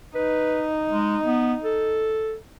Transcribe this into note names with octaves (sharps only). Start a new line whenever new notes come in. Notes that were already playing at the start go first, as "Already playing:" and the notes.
D#4 B4
G#3
B3
A4